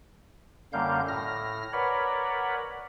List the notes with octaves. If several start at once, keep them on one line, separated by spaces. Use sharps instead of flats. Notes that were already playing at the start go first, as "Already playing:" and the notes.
F#2 D3 G3 A#3 F5 G6
A2 F6 A#6
A#4 B4 C#5 D5 F#5 B5